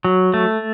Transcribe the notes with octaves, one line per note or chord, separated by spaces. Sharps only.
F#3
A3